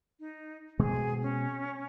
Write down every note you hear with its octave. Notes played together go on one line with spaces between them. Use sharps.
D#4
B2 G#3 C4 G#4
C#4